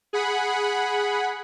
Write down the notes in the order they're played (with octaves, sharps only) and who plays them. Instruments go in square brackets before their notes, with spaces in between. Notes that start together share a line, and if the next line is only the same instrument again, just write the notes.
[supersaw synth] G#4 F#5 B5